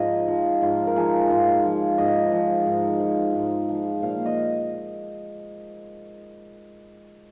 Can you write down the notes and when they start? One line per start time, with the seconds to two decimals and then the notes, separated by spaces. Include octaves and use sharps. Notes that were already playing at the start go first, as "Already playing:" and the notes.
Already playing: G#2 F3 D#5
0.28 F3
0.62 G#2 F4
0.87 A#4
0.96 F3 G#4
1.30 G#2 F4
1.64 F3
1.98 G#2 D#5
2.32 F3
2.66 G#2
3.00 F3
3.35 G#2
3.69 F3
4.02 A#2 F5
4.26 D#5